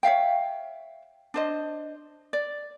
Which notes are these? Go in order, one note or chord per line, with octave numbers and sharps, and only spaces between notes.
C#5 E5 F5 G5
D4 C5 D#5
D5